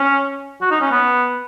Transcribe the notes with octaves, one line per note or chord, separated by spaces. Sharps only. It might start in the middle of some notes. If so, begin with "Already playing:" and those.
Already playing: C#4
F#4
D#4
C#4
B3